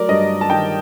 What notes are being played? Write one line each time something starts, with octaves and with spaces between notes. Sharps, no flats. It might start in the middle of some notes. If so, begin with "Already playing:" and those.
Already playing: F#3 A3 A#4 D5
G2 D#5
A5
D#3 G5